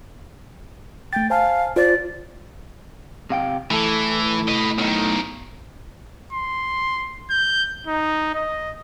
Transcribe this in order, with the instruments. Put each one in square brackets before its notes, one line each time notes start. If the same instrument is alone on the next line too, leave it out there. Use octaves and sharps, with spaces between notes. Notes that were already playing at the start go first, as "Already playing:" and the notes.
[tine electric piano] A3 A6 [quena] G5
[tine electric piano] C5 G#5 A5 [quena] F5
[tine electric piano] F4 C5 [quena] D5
[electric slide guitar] C3 F5 G5
[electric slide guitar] A2 A4 [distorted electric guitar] E3
[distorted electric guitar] B4 D#5
B1 D#3
[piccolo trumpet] C6
G6
D#4
D#5